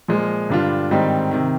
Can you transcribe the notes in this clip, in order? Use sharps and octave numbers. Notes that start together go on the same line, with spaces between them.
A#2 F3 G#3
G2 D3 G3 D4 F4
G#2 D#3 G3 C4 D#4
C3 D#3